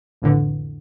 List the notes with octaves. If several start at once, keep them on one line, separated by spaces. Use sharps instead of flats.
B1 F2 A2 D3 E3